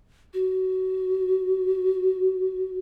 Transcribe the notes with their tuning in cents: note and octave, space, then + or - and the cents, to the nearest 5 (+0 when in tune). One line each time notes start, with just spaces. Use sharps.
F#4 +20